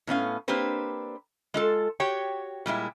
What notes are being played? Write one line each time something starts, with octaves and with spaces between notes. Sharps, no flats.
A2 B3 C#4 F5
A#3 C4 D4 G4 B4 C5
G#3 F4 A4
F#4 G4 C#5 G5
A#2 G3 G#3 E4